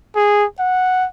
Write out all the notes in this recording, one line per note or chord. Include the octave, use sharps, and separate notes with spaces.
G#4
F#5